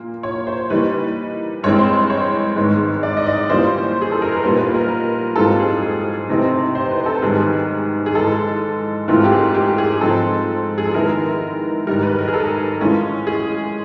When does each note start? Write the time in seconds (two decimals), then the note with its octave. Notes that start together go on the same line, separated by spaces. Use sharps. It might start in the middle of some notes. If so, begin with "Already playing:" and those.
Already playing: A#2 A#3
0.23 C#5
0.47 C5
0.70 E3 G3 A#3 D#4 B4
1.63 G2 E3 G#3 C4 C#5
1.79 C5
2.10 C#5
2.56 G#2 D#3 G#3 B3
3.03 D5
3.17 D#5
3.26 D5
3.49 E3 G3 A#3 C#4 F4 C5
4.01 G#4
4.12 A4
4.22 A#4
4.32 B4
4.43 A#2 G3 B3 D#4 C5
4.58 B4
4.74 A#4
5.36 G#2 E3 G3 C4 F4 A4
5.59 G#4
5.82 G#4
6.29 C3 E3 A3 C4 D#4
6.75 C5
6.91 B4
7.06 A4
7.22 G#2 D#3 G3 B3 G#4
8.06 G#4
8.15 G#2 E3 G#3 A4
9.08 G#2 E3 A3 C4 F4 A#4
9.24 G4
9.31 G#4
9.55 G4
9.78 G#4
10.01 G#2 F3 G#3 C4 A4
10.78 G#4
10.85 A4
10.94 D#3 G#3 B3 E4 A#4
11.87 G#2 D#3 G3 A#4
12.03 B4
12.19 A#4
12.28 G#4
12.34 A4
12.80 A2 E3 G#3 C#4 F4
13.27 G#4